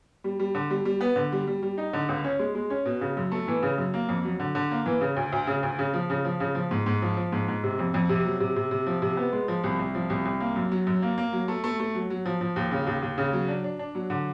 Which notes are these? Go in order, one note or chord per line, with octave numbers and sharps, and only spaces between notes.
G3
G3
D3
G3
G3
B3
D3
G3
G3
G3
D#4
D3
C#2
C#4
G#3
G#3
C#4
B2
C#3
F#2
A3
E3
C#3
F#2
A#3
F2
F#3
D3
D3
A#3
E3
C#3
D2
D2
C#3
D2
C#3
F3
C#3
F3
C#3
F3
G#2
G#2
F3
F3
G#2
G#2
C3
F2
F2
C3
F#3
C3
C3
C3
F3
C3
B3
G#3
F3
C2
C2
F3
C2
C2
A#3
F#2
F#3
F#2
A#3
A#3
F#3
A3
A3
A3
F#3
F#3
F3
F3
D#2
C#3
D#2
D#2
C#3
F#3
D4
D4
D4
F#3
D3